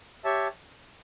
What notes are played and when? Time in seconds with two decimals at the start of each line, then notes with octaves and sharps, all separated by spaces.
0.24 G4 C#5 E5 A5